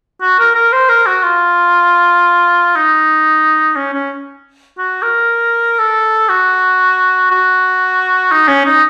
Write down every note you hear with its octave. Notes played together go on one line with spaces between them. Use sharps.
F#4
A#4
A#4
C5
A#4
F#4
F4
D#4
C#4
C#4
F#4
A#4
A4
F#4
F#4
D#4
C#4
D#4